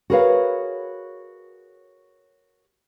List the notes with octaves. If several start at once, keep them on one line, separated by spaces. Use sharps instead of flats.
F#4 G#4 A#4 B4 C#5 F5